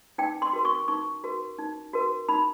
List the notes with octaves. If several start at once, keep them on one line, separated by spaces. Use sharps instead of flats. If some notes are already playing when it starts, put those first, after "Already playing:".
D#4 G5
C6
F#4 A#4
C#6
D#4 C#6
F#4 A#4
D#4
F#4 A#4
D#4 B5